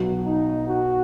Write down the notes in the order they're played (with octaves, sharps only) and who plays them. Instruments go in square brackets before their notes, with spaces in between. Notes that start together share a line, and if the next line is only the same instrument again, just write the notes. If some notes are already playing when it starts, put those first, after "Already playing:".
Already playing: [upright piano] B1 B2 F#3 B3
[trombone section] D#4
F#4